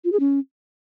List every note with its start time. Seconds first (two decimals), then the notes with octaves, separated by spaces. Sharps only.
0.05 F4
0.12 G#4
0.20 C#4